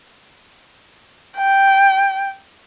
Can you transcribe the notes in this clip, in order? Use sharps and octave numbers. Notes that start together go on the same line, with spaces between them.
G5